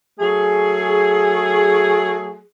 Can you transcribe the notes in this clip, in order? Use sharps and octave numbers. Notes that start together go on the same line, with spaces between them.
F#3 A3 G#4